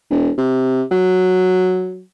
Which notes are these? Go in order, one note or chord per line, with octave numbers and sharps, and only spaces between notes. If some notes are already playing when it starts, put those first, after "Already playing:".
E1
C3
F#3